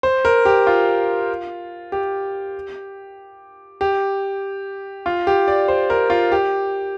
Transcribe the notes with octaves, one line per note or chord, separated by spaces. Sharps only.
C5
A#4
G4
F4
G4
G4
F4
G4
D5
C5
A#4
F4
G4